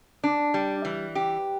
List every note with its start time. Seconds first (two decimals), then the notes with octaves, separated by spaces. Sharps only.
0.24 D4
0.54 G3
0.85 E3
1.15 G4